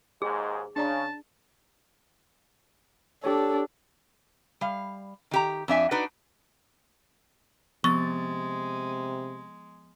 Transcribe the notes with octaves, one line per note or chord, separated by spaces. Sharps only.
D#2 G#2 G#3 G#4
C#3 D4 D5 A5 A#5
D4 G4 A4 C#5
G3 F5
D#3 G4 A#5
F2 D4 E5 G#5
D4 D#4 F#4 B4 D5
C3 F3 G#3 B3 C#6 A6